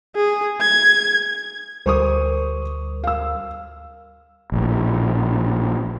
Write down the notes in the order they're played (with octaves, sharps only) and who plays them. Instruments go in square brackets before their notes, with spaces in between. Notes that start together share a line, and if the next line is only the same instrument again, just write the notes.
[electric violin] G#4
G#6
[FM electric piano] D2 G3 A#4 [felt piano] C5 C#6 D#6
[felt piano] F5 E6
[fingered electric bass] A#1 A2